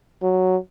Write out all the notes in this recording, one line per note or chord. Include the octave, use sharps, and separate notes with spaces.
F#3